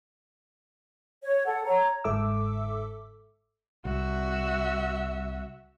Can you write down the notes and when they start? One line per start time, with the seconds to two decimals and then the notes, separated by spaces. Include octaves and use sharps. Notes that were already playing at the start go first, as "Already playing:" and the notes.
1.23 C#5
1.45 A4 F#5
1.64 C#5 A#5
2.04 G1 G#2 A4 E5 D6 E6
3.85 C2 F#4 E5